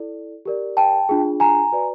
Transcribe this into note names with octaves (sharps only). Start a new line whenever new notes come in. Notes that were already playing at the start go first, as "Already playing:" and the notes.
Already playing: E4 A4 D5
G4 A#4 D5
G5 A5
D4 F4 G#4
G#5 A#5
F#4 B4 D5